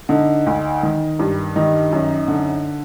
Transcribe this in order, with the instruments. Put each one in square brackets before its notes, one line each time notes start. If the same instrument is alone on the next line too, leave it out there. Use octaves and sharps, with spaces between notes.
[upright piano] D3 D#4
D2
D#3
G2
D#3 D#4
F#2
D3